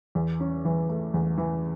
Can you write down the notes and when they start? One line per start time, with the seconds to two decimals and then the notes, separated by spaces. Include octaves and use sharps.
0.15 E2
0.40 C#4
0.65 E3
0.89 A3
1.14 E2
1.38 E3